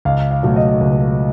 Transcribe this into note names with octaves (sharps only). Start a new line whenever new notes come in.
C#2 F5
F5
B2 F#3 A3
D#5
C#2